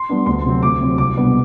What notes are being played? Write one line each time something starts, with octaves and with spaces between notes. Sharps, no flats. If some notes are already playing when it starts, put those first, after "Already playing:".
Already playing: C6
G3 B3 D4
D2 C6
C3 F#3 C4
D2 D6
C3 F#3 C4
C2 D6
B2 G3 B3 D4